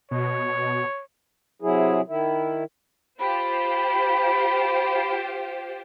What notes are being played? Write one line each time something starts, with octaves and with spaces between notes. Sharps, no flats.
B2 C#5
C3 F#3 E4 G#4
D#3 E4
F4 G4 C5 B5